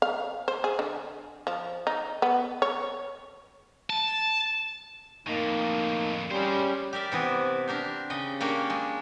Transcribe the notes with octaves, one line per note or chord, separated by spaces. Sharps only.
F5
C5
G#4
D3
F3
D#4
B3
C#5
A5
F2 A2 A#3 D#4
G3 G#3 C#4 C5
G4 A#4 D5 E5
C3 E3 B3 C4
D4 G4 A#4 C5
C#3 D#5 G5
A#3 C#4 D4 G4 A#4 C#5
G#3